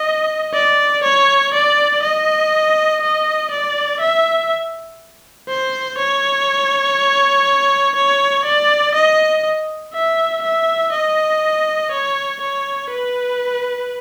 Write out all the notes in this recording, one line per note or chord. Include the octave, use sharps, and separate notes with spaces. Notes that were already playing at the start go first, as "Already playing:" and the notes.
Already playing: D#5
D5
C#5
D5
D#5
D#5
D5
E5
C5
C#5
C#5
D5
D#5
E5
E5
D#5
C#5
C#5
B4